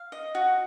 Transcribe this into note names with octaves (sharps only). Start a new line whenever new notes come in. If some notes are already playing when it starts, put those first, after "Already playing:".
Already playing: F5
D#5
F#4